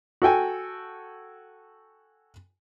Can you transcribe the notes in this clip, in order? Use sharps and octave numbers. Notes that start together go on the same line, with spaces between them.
F#4 A4 G5 G#5